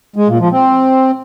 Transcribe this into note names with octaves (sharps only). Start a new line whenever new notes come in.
G#3
A#2
F3
C4